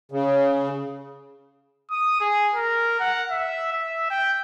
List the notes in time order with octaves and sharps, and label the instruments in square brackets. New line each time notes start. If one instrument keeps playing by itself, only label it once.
[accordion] C#3
[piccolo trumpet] D#6
G#4
A#4
F#5
E5
E5
G5